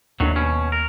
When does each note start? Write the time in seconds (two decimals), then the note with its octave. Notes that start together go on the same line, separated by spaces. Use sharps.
0.20 D#2 A2 D#3 F#3 D4
0.36 B2 C#4
0.72 A#4